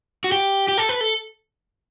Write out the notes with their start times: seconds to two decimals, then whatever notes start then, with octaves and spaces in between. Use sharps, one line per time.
0.24 F#4
0.32 G4
0.68 G4
0.78 A4
0.89 B4
1.01 A4